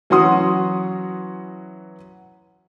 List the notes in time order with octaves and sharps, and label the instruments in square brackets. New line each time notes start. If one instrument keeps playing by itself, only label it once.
[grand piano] E3 F#3 C#4 F#4 C6 D#6